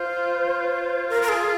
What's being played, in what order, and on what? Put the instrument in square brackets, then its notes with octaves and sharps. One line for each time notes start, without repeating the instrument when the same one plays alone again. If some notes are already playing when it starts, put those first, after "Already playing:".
Already playing: [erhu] F4 [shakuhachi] C5
[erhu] F4 [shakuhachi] A#4
[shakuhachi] A#4
G#4